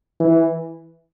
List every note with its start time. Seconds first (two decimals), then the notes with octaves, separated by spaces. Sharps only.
0.20 E3